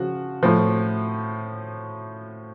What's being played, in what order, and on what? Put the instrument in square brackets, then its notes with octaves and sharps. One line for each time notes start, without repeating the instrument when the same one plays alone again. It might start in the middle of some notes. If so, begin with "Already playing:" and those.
Already playing: [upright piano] C#3 F3 F#4
A2 F3